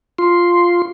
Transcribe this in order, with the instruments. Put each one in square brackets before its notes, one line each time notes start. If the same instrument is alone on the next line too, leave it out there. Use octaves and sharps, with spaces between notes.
[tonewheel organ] F4 C6